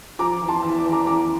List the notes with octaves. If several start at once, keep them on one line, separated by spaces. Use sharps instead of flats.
F3 A#5 D6
E2
A5 C6
E2
D6
E2
A#5 D6
E2 A#5 D6